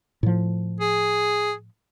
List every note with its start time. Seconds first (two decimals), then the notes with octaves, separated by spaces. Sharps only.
0.23 A2 F3
0.80 G#4